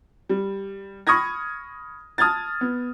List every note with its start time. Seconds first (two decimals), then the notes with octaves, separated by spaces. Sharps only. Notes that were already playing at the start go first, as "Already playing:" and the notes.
0.29 G3
1.07 B5 C#6 D#6 F6 G#6 A#6
2.18 A5 D#6 F6 G#6 A6
2.61 B3